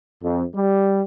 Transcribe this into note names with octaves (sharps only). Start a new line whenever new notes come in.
F2
G3